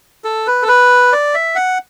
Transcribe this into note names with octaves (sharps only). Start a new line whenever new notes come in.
A4
B4
A4
B4
D5
E5
F#5